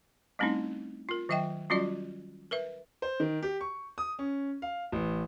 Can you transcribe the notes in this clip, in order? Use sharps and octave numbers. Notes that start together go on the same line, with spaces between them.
G3 A3 C4 C#4 D#4 E4
F4 A#4
D#3 F#3 D#5 E5 G5
F#3 G3 C#4 F4 F#4 D5
A#4 B4 E5
C5
D#3
G4
C#6
D#6
C#4
F5
A1